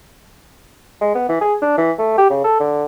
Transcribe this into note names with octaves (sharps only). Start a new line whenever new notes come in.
G#3
B3
E3
G#4
D4
E3
A3
G4
C#3
A4
D3